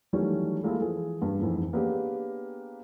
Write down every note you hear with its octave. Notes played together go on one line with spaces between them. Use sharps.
D#3 E3 F#3 G3 A3 C#4
G3 G#3 A#3 E4 F4 A4
E3 F3 G#4
G2
F2 G#2 E3
A#3 B3 C#4 D4 G4 G#4